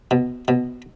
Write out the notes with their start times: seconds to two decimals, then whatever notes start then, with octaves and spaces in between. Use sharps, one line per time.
0.11 B2
0.48 B2